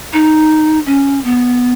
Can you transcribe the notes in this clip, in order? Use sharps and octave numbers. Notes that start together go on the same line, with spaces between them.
D#4
C#4
B3